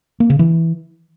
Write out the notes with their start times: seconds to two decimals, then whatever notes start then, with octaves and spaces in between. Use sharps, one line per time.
0.20 A#3
0.30 C#3
0.39 E3